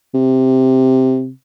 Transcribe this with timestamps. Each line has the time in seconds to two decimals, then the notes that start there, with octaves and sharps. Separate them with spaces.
0.14 C3